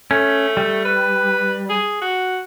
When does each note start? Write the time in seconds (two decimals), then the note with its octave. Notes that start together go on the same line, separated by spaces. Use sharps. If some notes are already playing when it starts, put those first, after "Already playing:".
0.11 A3 C#4
0.57 G3
0.85 B4
1.69 G#4
2.02 F#4